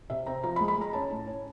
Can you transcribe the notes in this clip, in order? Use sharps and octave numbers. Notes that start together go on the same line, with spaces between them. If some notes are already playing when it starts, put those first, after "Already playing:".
C3 E5
C4 A#5
F3 A#5
B5
G#3
B5
G#3 A#5
C#4 A5
A2
C#4